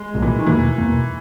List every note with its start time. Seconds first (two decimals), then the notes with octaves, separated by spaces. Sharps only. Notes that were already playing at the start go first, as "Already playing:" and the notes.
Already playing: G#3
0.14 B1 A#2 G3 A#3
0.22 E3
0.39 D#3
0.46 E2 B2 E3 A#3
0.78 E2 B2 A#3